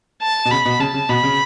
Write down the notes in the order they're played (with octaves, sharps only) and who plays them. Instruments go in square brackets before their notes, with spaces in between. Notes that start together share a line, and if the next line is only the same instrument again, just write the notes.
[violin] A5
[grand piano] B2
[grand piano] C#3 [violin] B5
[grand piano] B2
[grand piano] C#3 [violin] A5
[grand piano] C#3
[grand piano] B2 [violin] B5
[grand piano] C#3